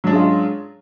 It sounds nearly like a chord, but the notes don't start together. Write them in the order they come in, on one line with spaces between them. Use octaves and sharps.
F#3 D4 C#4 G#3 F4